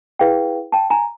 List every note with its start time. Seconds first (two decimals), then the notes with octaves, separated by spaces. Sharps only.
0.19 E4 G#4 B4 F5 G5
0.72 G5 A5
0.90 G#5 A#5